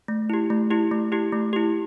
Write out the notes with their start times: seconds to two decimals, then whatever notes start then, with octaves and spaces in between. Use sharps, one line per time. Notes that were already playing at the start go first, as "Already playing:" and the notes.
0.08 A3
0.30 E4 G4
0.50 A3
0.71 E4 G4
0.92 A3
1.12 E4 G4
1.32 A3
1.53 E4 G4